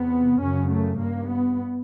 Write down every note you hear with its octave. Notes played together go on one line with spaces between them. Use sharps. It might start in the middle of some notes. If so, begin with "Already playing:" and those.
Already playing: E2 C3 B3
F#2 C#3 C#4
A3
G2 A#3
B3